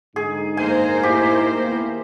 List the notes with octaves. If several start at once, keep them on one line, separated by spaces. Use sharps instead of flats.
G#2 D3 D#4 G#4
A#3 C5 G#5
A2 D#4 E4 G4
D#2 B3 E4